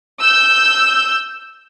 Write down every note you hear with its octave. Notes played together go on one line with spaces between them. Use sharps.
E6 G6